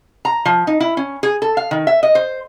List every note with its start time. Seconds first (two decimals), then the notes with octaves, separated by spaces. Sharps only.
0.25 A#5
0.45 F3
0.67 D#4
0.80 E4
0.97 C#4
1.23 G#4
1.42 A4
1.57 F5
1.71 D#3
1.87 E5
2.03 D#5
2.15 C5